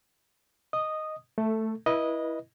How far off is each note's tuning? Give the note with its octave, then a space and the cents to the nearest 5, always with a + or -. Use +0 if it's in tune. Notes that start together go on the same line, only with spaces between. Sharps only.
D#5 +0 D#6 -10
A3 +0 A4 +15
E4 +0 B4 -30 D#5 +0